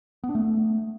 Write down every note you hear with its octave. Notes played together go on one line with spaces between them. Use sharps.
B3
D4
A3